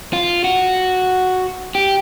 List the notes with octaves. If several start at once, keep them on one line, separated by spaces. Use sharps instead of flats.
F4
F#4
G4